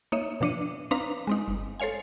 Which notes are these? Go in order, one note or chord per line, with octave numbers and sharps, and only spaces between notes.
A#3 D#4 C#5 D#5 E5
B2 F3 D4 C#7 D#7
C4 D4 D#4 B4 F5 A#5
G#3 C4 D#4
G1
A4 C5 C#5 F5 G#5